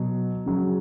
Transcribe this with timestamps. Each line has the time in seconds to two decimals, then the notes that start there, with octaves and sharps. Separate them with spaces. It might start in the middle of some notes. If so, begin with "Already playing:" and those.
Already playing: B2 F#3
0.46 C#3 F#3